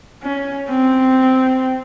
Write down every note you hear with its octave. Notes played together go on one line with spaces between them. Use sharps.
C#4
C4